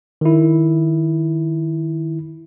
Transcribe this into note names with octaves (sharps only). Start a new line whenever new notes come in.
D#3 E4